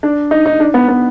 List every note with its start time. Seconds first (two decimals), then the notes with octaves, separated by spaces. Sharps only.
0.03 D4
0.31 D#4
0.46 D#4
0.60 D4
0.74 B3
0.88 B3